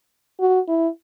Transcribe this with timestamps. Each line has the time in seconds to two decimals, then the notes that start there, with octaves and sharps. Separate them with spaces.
0.40 F#4
0.68 E4